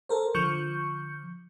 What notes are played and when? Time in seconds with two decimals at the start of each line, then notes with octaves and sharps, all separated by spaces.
0.09 A4 A#4 C5
0.35 D3 F3 C#6 G6 C#7